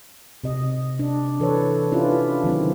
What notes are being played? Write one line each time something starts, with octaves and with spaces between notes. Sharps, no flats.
C3 D#5
D4
E3 A4 B4 C#5
C#4 D4 E4 F4 G4 B4
D#3 F#3 C4 E4